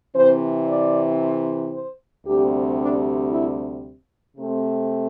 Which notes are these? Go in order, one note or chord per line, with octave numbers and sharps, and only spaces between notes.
C3 E3 C4 C5
D5
C5
D2 C3 G3 C4 G4
D4
E4
C3 A3 C4